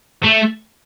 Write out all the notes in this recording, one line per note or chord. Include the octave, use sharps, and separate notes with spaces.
A3